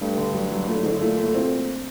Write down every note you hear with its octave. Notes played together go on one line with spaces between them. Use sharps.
G2 A3
D3
F#3
F#3
A#2 A3
A2
G#2 D3
A2
A#2 A3
A3
A2
A#2 C4